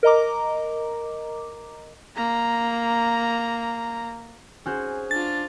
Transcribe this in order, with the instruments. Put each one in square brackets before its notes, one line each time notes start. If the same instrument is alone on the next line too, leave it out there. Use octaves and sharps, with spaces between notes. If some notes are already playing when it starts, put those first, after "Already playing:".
[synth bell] A#4 D#5 A#5 D6
[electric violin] A#3 A#5
[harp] C#4 F#4 C5 [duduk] G#4
[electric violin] D4 F4 [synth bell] A6